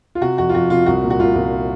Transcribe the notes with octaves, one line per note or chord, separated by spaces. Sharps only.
F4
C3 F#4
F2 F#4
F4
F2 F#4
C3 F4
C2 F#4
A#2
F#4
C2 F4
C2 F4